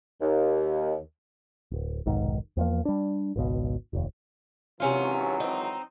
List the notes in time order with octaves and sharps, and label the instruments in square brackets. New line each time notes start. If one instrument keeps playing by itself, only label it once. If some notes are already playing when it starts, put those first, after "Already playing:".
[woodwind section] D#2
[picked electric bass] D1
F1 B1 G#2 D#3
E2 F3 A#3
G3 D4
G#1 C#2 B2
F1 D#2
[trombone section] G#1 E3 F#3 [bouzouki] C3 C#4 F4
[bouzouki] C4 D#4